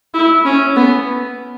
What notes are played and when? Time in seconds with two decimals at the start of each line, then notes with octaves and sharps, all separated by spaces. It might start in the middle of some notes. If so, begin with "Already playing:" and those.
0.14 E4
0.45 C#4
0.76 B3